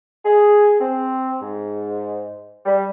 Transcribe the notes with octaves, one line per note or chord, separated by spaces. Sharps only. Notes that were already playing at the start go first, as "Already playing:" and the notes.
G#4
C4
G#2
G3